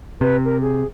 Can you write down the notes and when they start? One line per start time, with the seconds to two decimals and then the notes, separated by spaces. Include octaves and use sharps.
0.21 C3 B4
0.45 A#4
0.61 G#4